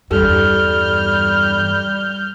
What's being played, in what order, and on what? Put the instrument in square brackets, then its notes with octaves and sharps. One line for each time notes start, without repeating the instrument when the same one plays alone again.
[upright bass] E2 G2 [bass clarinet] G3 [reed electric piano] G4 A4 [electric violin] F6 G6